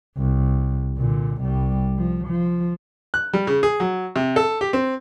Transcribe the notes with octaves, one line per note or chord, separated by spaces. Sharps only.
C2
A#2 D3
C2 G3
F3
F3
F#6
G3
C#3
G#4
F#3
C3
A4
G4
C4